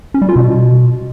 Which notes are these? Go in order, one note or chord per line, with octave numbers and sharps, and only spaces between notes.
C#4
G3
F4
B2